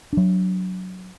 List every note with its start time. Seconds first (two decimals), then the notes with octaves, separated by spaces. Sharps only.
0.13 F#3 D4